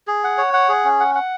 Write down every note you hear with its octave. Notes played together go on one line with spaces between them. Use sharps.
G#4
F#5
C#5
F#5
G#4
C#4
F#5
F#5